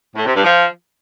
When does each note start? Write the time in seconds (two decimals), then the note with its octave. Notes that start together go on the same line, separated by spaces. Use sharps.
0.16 A2
0.25 C3
0.35 G2
0.44 F3